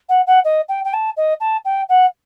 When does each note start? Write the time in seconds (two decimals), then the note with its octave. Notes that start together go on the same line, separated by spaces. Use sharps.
0.09 F#5
0.27 F#5
0.44 D#5
0.69 G5
0.84 G5
0.93 A5
1.17 D#5
1.40 A5
1.65 G5
1.89 F#5